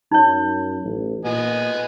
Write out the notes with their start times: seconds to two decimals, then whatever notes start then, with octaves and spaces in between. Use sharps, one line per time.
0.12 F#2 D#4 C#5
0.84 A1
1.25 A#2 B3 D#5 G#5